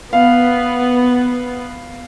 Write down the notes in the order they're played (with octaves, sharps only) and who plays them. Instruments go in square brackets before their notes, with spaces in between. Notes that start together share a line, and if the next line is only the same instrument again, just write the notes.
[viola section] B3 [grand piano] F5